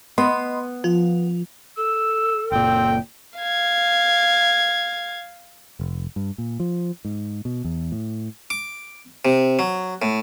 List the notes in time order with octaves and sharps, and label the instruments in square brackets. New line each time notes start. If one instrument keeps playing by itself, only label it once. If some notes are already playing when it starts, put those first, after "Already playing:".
[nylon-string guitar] B3 [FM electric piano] D#5 B5 C6
[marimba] F3 [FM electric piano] F4
[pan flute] A4 [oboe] E6
[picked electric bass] F#1 A#2 [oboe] C4 [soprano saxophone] G5
[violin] F5 G#6
[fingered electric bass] F1
G2
A#2
F3
G#2
B2
E2
A2
[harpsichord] D6
C3
F#3
A2